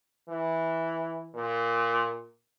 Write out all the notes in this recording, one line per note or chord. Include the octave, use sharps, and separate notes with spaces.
E3
A#2